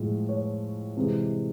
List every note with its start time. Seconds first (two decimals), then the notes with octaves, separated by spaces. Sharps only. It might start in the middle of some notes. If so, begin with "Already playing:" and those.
Already playing: A2 F3 G#3
0.29 C#5
0.97 C3 E3 G#3